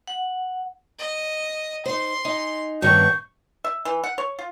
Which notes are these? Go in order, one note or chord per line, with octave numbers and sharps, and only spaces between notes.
F#5
D#5
D#4 C5 C6
D#4 D#5 G#5
G2 D#3 A3 B3 C#4 D#5 C#6 G6
E5
E3
F#5
C#5
F4